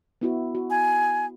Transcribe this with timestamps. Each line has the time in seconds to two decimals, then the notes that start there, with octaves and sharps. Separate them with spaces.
0.21 B3 E4 F#4
0.55 F#4
0.70 G#5